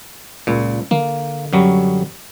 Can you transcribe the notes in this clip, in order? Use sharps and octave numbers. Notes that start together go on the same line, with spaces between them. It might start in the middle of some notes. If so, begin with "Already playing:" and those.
C#2 A#2
D3 A#3
F#2 F#3 G3